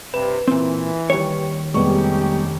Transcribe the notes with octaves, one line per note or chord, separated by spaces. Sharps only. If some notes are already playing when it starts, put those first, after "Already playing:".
G2 C3 B4 E7
A#2 E3 C4
D#2 D#3 G3 C#5
F1 G3 G#3 B3 C#4 D#4 G4 C#6